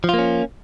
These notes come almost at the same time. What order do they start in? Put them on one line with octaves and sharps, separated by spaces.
F3 F4 A#3 C#4